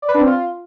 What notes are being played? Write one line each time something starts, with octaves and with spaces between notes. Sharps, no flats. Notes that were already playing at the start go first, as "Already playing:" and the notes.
D5
B4
D4
C4
F4